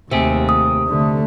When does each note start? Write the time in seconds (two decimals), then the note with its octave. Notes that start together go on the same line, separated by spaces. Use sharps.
0.11 D#2 C3 A3 G4 G#4
0.49 D#6
0.87 D3 A3